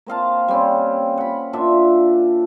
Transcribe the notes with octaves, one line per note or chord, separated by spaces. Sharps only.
A#3 C4 F5 A5
G3 C4 C#4
F#5 B5
A#2 D4 F4 E5